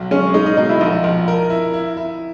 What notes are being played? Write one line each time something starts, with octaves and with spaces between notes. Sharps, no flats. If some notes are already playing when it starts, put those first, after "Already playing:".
Already playing: B1
G#3 C#4
G#3 D#4
D#4
B2 D#4
E4
A#1 D#4
A#1
A#4
E4
E4
E4